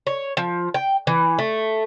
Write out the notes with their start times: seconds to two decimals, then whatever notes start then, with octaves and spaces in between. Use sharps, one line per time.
0.07 C#5
0.37 F3
0.74 G5
1.07 E3
1.39 A3